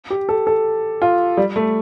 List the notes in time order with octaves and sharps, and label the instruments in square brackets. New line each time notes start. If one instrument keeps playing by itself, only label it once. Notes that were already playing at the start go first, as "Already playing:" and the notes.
[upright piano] G4
A4
A4
F4
G3
A3